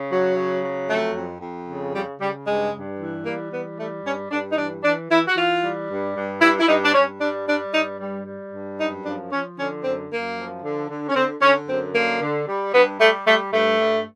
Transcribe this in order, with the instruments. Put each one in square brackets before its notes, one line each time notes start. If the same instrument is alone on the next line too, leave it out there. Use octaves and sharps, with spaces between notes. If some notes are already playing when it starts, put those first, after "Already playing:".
Already playing: [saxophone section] C#3
F#3
C#3
F#3
F2 A3
F2
F2
C#3
C#3 G3
C#3 G3
G2 G#3
G2
E3
G3 A#3
E3 B3
G3 A3
G2 C#4
G2 D4
D#4
E3 D4
E3 D4
E3 E4
F#4
E3 F4
G3
G2
G2
G2 E4
E4
G2 D#4
D4
G2 C#4
G3 D4
G3 D4
G2 D#4
G3
G3
G2
F#2 D#4
F3 D4
F3 C#4
D3 C#4
F#2 C4
F#2 A#3
F3
D3
D3
C#4
D3 C4
D3 C#4
F#2 C4
D3 A#3
D3
G3
G2 B3
G3 A3
G3 A3
G2 A3
G2